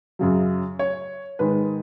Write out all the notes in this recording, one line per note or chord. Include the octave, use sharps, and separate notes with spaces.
F#2 C#3 F#3
C#5
G#2 D#3 G#3 B4